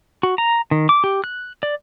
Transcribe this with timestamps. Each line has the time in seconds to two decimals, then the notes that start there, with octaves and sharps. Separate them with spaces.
0.23 F#4
0.38 A#5
0.71 D#3
0.89 D6
1.04 G4
1.24 F#6
1.63 D5